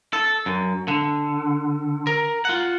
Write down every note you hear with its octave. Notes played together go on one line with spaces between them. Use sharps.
A4
F#2
D3
A#4
F4 F#5